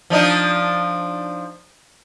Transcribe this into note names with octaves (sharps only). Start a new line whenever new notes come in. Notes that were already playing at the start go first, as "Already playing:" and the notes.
F3 D4 D#4